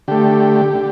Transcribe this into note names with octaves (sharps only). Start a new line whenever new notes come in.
D3 A3 G4
D3